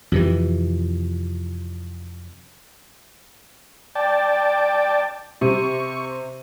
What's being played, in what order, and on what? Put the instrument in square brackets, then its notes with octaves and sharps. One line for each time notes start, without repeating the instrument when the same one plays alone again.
[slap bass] F2 C3 E3
[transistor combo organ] D5 G5 A5
[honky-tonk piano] C3 [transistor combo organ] C#6